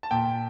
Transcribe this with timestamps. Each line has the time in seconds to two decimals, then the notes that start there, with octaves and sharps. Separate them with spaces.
0.03 A5
0.11 A#2 G5